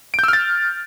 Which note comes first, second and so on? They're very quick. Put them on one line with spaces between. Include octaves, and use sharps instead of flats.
D7 G6 E6 F6 A6